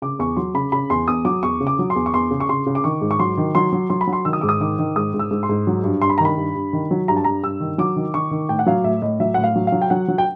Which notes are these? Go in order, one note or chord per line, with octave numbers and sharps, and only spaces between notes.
C#3 D6
E2 C#6
F#3 C6
C#3 B5
C#3 B5
E2 C6
E2 D#6
F#3 D6
E2 C#6
C#3
D6
F#3
C6
E2
C#6
E2 C6
C#3
C#6
C#3 C6
C#3
D6
D#3 C#6
G#2
C#6
F#3 C6
D#3
F#3 C6
F#3
F#3 C6
B5
F#3
C6
D#3 E6
D#6
G#2 D6
D#6
D#3 D6
D#3
G#2 D#6
G#2
E6
G#2
C6
G#2
F#3
G2
G2 C6
B5
D#3 A#5
B5
G2
G2
D#3
F#3
G2 A#5
A5
G2 A#5
G2 E6
D#3
F#3 D6
D#3
D#3 C#6
D#3
A2 G5
F#5
F#3 F5
A2 E5
A2 D#5
F#3 E5
A2 F#5
F5
F#3
F5
F#3
G5
F#3 F#5
F#3
G5